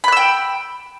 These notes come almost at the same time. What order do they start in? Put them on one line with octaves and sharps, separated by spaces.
B5 F#6 E6 G5